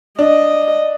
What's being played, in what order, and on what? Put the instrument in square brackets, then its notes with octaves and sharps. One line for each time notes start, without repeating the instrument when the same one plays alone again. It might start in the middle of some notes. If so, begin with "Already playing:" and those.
[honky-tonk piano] D4 [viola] D#5